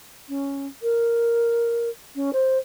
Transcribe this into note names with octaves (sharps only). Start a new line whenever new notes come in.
C#4
A#4
C#4
C5